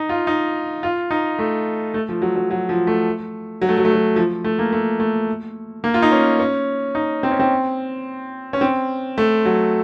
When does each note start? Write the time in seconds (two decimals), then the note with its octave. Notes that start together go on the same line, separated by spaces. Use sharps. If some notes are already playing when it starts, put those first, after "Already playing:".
Already playing: D#4
0.09 F4
0.27 D#4
0.83 F4
1.11 D#4
1.39 A3
1.94 A3
2.09 F3
2.22 F#3
2.36 F#3
2.50 F#3
2.69 F3
2.87 A3
3.62 F#3
3.68 A3
3.78 F#3
3.85 A3
3.93 F#3
4.16 F3
4.44 A3
4.59 A#3
4.72 A3
5.00 A3
5.84 A#3
5.94 F4
6.02 D#4
6.12 C#4
6.39 C#4
6.95 D#4
7.23 C4
7.31 C#4
7.40 C4
8.53 C#4
8.61 C4
9.18 A3
9.45 F#3